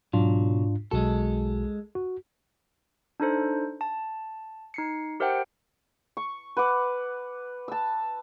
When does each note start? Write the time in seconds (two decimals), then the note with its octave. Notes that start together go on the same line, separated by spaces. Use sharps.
0.13 B1 G#2 F#3 D4 F4
0.91 B1 G#3 F#4 A4
1.95 F#4
3.20 D4 D#4 A4 C5
3.81 A5
4.74 D#4 C7 C#7
5.20 G4 A#4 C5 E5 F#5 G5
6.17 C#6
6.57 B4 F#5 D6
7.68 A5 E6